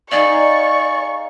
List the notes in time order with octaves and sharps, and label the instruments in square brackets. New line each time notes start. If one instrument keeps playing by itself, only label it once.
[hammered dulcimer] D#4 G#4 F5 [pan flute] D5 [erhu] C#6